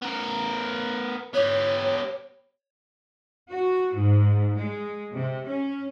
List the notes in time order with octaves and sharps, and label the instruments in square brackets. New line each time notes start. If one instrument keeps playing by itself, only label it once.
[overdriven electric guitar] B3 A#4
[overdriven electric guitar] B3 G4 [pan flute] C#5
[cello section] F#4
G#2
G#3
C3
C#4